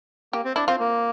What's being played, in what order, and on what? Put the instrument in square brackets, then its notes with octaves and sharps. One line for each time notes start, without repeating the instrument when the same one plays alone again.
[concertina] A#3 [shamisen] G4
[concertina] C4
[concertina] D4 [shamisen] E4
[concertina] C4 [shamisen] F4
[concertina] A#3